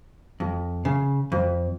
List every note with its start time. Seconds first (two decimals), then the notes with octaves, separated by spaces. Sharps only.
0.40 F2
0.85 C#3
1.32 F2